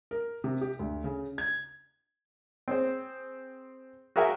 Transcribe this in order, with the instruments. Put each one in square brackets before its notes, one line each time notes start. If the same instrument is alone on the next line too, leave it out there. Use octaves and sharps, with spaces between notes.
[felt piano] A#4
C3
G4
D2
C#3
G#6
[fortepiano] C4 G#4 C5
F#4 G#4 A#4 E5 G5 G#5